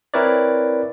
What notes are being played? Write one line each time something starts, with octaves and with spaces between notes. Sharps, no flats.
C4 E4 A#4 B4 C#5 D5